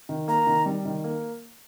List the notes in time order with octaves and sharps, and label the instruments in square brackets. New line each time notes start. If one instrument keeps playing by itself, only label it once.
[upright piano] D#3
[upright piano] A#3 [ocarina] A#5
[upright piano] D#3
G3
D#3
A#3